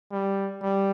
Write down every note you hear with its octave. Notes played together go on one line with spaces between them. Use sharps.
G3
G3